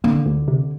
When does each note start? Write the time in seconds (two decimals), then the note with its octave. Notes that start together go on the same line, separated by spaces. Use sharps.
0.04 D3 A#3
0.26 D2
0.48 C3